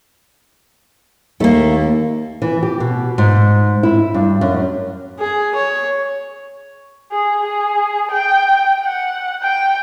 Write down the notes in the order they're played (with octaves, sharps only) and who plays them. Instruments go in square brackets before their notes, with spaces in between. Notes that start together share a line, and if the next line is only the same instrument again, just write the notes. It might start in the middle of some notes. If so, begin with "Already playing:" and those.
[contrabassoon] D#2 [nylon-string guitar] A3 A#3
[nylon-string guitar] E3
G4
B2
G#2
E4
G2
F#2
[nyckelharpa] G#4
C#5
[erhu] G#4
G#4
G5
F#5
G5